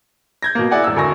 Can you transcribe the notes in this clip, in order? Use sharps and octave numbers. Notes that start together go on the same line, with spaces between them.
G6 G#6 A#6
B2 A#3
E4 G#4 D5 F#5 G#5
E1 E6
F1 D2 A#4 G#5 C#6 A#6